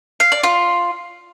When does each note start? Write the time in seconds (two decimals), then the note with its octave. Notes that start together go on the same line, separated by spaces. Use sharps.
0.20 F5
0.32 D5
0.43 F4